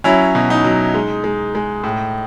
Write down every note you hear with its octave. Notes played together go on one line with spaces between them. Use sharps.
F#3 C#4 E4
B2
D#4
F#3
G#3
G#3
G#3
A2